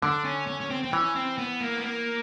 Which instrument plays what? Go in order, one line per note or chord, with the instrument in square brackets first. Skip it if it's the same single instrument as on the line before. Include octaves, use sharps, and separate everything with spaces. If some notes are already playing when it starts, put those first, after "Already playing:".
[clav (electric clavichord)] D3 [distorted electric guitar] D4
[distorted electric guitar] C#4
C#4
C#4
C4
C4
[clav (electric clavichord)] E3 [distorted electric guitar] C#4
[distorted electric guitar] C4
B3
A#3
B3
A#3